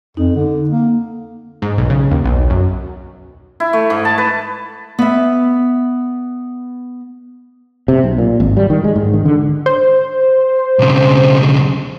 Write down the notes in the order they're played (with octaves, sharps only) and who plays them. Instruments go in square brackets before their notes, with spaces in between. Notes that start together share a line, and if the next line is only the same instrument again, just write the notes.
[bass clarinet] F2 [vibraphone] D#4
[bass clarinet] D3
A#3
[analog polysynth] G#2
B1
C#3
D#2
B1
F#2
[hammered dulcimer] E4
A3
G#2
A5
B4
[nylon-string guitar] B3 E5
[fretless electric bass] C3
B1
A#2
G#1
G3
D#3
G#3
G#2
D#3
D3
[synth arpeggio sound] C5
[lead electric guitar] B1 C#3